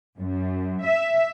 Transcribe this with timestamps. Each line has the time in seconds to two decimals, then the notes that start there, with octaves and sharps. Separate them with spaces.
0.20 F#2
0.83 E5